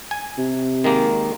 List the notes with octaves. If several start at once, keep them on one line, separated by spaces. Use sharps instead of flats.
G#5
C3
D#3 G#3 A#3